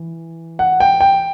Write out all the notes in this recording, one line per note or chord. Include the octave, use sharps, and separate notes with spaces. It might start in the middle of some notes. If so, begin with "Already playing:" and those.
Already playing: E3
F#5
G5
G5